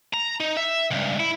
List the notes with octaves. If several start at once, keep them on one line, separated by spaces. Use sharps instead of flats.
A#5
D#4
E5
C#2 G2
E4